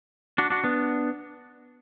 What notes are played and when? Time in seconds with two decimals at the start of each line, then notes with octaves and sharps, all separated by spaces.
0.38 D4 F#4
0.50 D4 F#4
0.64 B3 D4